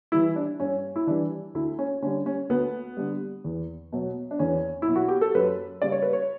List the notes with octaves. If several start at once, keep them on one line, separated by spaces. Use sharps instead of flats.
E3 G3 E4
D4
G2 C#4
E4
E3 G3 D4
D2 E4
C#4
D3 G3 C#4
C#4
D2 B3
D3 G3
E2
B2 F#3
D4
E2 C#4
E4
B2 F#3
F#4
G4
A4
F#2 B4
C#3 G3 D5
C#5
B4
C#5